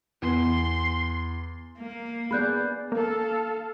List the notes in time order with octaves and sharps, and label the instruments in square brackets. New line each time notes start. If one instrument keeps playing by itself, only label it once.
[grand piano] E2 [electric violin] C6
[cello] A#3
[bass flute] B3 [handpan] G#4 D5 [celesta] B5 F#6 G6
[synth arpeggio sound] A#3 [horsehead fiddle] A4 F5